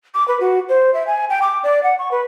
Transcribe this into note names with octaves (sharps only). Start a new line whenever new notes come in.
D6
B4
F#4
C5
E5
G#5
G5
D6
D5
F#5
C#6
B4